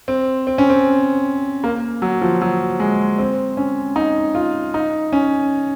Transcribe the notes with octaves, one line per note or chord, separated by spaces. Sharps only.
C4
C4
C#4
C4
A#3
F#3
F3
F#3
G#3
C4
C#4
D#4
F4
D#4
C#4